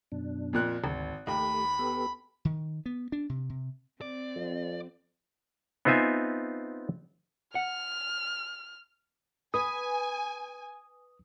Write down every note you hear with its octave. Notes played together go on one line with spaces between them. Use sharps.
F#2 B2 D4
F2 A#2 F#6
G#1 D2
D#2 A3 G4 B5
B3 G4 A4
D#3
B3
D4
C3
C3
C4 D5
F2
B3 C4 D#4 F4 E5 G#5
F#5 F6
B4 G#5 D#6